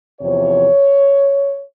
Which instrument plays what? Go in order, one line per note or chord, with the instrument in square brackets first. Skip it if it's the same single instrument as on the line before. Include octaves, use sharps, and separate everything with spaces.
[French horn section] E2 C3 F3 C#5